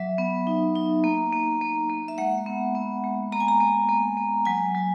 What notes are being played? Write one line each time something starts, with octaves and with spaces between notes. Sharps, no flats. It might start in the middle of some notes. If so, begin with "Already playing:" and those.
Already playing: F#3 E5
B3
D#4
D#4
A#3
A#3
A#3
A#3
E5
G#3 F#5
B3
B3
G#3
A#3 A#5
G#5
A#5
A#3
A#3
A#3
F#3 G#5
F#3